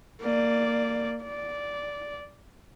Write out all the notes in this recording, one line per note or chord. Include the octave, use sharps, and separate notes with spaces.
A#3 D5
D5